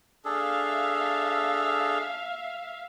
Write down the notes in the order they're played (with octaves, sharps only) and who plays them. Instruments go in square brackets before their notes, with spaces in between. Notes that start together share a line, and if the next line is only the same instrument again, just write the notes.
[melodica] D4 G#4 A4 [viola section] E5 F5